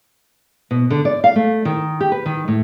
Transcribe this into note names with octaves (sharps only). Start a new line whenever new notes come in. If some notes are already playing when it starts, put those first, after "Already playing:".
B2
D3
D5
F5
A3
D#3
G4
B4
D#3
A2